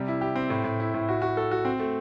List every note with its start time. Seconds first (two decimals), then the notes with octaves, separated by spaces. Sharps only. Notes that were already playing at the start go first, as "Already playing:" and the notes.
Already playing: C3 G3
0.08 E4
0.21 G4
0.36 C4
0.50 A2
0.64 A2
0.80 E4
0.94 A2
1.09 F#4
1.22 F#4
1.37 A4
1.51 F#4
1.65 C4
1.79 A3